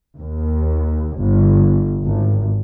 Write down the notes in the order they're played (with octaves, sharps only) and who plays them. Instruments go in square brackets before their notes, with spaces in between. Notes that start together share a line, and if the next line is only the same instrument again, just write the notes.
[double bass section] D#2
G1
G#1